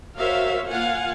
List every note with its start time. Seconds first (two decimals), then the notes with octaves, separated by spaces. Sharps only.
0.17 F#4 A#4 C5 C#5 E5 F5
0.69 A#3 F4 F5 F#5 G#5